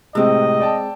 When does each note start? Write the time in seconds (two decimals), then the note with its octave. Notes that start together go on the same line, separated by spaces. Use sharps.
0.15 A2 C3 G#3 C4 D#5 E6
0.60 D5 G5 A5